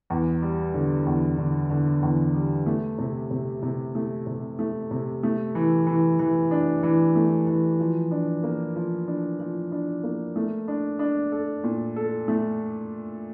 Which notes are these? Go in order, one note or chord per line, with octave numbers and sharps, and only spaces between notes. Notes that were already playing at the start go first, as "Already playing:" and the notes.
E2
G3
D3
E2
D3
D3
E2
G3
A3
C3
C3
C3
A3
C3
A3
C3
A3
E3
E3
E3
D4
E3
A3
E3
F3
D4
A#3
F3
D4
F3
D4
A#3
A3
D4
D4
A4
A#2
A4
A3